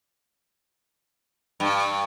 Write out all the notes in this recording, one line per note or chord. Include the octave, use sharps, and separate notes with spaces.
G2